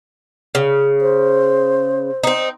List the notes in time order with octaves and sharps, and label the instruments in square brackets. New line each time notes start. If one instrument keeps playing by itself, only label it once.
[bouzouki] C#3
[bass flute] C5
[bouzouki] C4 D#4